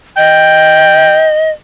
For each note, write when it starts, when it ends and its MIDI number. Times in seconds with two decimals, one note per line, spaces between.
0.17 1.50 75
0.17 1.28 79